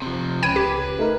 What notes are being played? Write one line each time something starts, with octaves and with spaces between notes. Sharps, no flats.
C3 F3
C#2 C#4 B4 G5 G#6 D#7
G4
A3 D#4 A#4